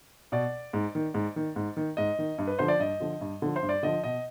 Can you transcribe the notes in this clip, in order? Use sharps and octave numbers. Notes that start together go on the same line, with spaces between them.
B2 D5
G#2
D#3
G#2
D#3
G#2
D#3
G#2 D#5
D#3
G2
B4
D3 F3 C5
D5
G2 D#5
D3 F3
G2
D3 F3
C5
G2
D5
D3 F3 D#5
B2 D#5